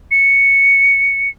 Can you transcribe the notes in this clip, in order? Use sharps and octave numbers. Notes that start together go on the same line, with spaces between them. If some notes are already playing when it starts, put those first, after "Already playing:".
C#7